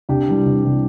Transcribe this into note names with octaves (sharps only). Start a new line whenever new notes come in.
C2 D4 G4
C3 E3 G3
C2
C3 E3 G3